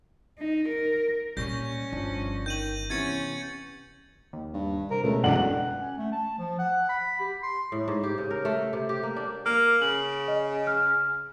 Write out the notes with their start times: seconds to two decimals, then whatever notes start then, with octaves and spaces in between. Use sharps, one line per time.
0.39 D#4
0.69 A#4
1.37 A#2 G3 A#3 C#4 G6 A#6
1.93 G1 F3 D4
2.46 D#3 G6 D#7 F#7
2.90 C3 E3 B3 C#4 G#6 A6 C#7
4.33 D#2
4.54 G2
4.91 C3 A#4
5.04 C#2 B2 A3
5.23 E1 F#2 D3 F#5 F#7
5.52 F#5
5.79 C#4
5.98 A3
6.12 A5
6.39 F3
6.59 F#5
6.89 B5
7.20 G4
7.43 C6
7.72 A2
7.88 G#2
8.03 G4
8.18 C#3
8.31 A#4
8.45 A3
8.73 C3
8.89 G4
9.03 A#3
9.16 D4
9.46 A#3 F6
9.82 C#3 F#7
10.28 D#5
10.67 F6